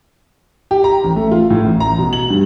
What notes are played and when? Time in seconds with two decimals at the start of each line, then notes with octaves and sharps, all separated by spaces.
0.71 G4
0.84 A#5
1.04 A1
1.16 A3
1.31 F4
1.50 A2
1.64 A1
1.80 A#5
1.98 B2
2.13 F#7
2.30 G2